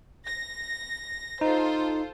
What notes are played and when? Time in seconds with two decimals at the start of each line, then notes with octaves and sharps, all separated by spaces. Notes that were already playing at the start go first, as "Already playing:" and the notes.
0.24 A#6
1.41 D#4 F4 A4 C5